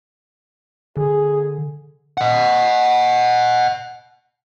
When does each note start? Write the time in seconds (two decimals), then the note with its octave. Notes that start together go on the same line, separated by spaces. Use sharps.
0.97 D3 G#4
2.17 D#5 F#5